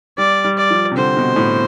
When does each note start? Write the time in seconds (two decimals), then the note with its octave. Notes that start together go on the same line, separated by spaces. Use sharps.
0.18 G3 D5
0.44 G3
0.58 D5
0.70 F3
0.91 C3
0.97 D3 C5
1.17 B2
1.36 A2